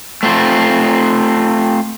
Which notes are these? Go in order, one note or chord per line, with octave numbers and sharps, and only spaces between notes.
A3 C4 F4